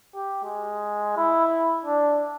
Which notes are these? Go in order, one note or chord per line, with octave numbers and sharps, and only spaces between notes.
G4
G#3
E4
D4